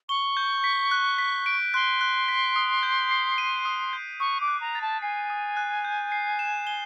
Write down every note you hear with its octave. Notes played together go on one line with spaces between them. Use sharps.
C#6 G7
G6
B6
F#6
B6
D7
C6 F#6
F#6
B6
D#6
G6
C7
D#7
D#6
G6
C#6 D#6
D6
F#6
A#5
A6
A5
G#5 C7
D#6
F#6
G6
C7
E7
G7